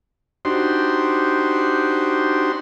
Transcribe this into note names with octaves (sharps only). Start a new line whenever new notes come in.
D4 D#4 F#4 G4 C5 C6